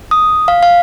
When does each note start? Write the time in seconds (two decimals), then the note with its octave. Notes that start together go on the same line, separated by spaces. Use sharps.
0.11 D#6
0.48 F5
0.63 F5